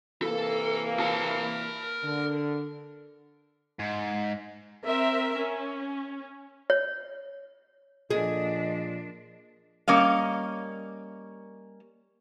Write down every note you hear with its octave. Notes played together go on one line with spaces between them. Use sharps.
C3 E3 A#3 A4
A#4 A5
D3
G#2
C4 A#4 E5
C#4
C#5
A#2 F3 D4 G#4 D#5
G3 A#3 C#4 D#5 F5